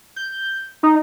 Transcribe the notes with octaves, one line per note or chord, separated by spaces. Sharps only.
G6
D#4